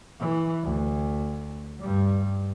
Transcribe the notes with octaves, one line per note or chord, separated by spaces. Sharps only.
E3
D2
G2 G3